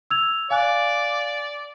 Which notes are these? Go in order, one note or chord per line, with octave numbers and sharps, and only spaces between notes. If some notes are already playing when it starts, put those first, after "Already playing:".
E6 G#6 F7
D5 F5 G#5 F#6